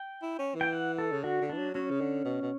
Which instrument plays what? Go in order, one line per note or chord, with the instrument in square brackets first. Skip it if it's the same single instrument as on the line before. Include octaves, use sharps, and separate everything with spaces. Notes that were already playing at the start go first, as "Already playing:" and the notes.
Already playing: [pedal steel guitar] G5
[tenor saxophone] E4
C#4
E3
[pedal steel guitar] G5
F#5
A4
[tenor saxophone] C#3
[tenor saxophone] D3 [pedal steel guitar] F#4
[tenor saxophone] D3
[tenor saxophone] E3 [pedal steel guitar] D4
[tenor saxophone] F#3
[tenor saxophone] F#3 [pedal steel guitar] C#4
[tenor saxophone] C#3
D3
B2
B2